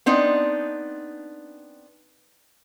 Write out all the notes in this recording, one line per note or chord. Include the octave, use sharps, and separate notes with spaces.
B3 C4 D4 D#4